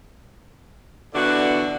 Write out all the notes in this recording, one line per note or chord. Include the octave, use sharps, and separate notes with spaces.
B2 D3 E3 D4 F#4